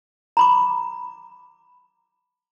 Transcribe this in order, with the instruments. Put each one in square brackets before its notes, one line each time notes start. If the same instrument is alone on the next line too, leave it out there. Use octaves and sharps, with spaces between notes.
[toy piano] A#5 B5 D6